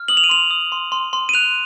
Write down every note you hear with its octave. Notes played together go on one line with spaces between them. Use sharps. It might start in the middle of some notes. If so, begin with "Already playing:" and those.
Already playing: F6
D#6 F#7
F7
D#7
C6 F7
D#6
C6
C6
C6
D#7
F#6 F7